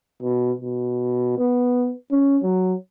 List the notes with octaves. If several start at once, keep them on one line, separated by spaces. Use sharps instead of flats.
B2
B2
B3
C#4
F#3